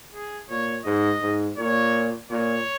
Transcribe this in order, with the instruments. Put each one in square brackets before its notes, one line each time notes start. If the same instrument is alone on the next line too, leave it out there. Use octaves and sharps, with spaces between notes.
[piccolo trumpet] G#4
[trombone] A#2 [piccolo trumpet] C#5
[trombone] G#2 [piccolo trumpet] D#5
[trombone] G#2
[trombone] A#2 [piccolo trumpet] C#5
[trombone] A#2 [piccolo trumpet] C#5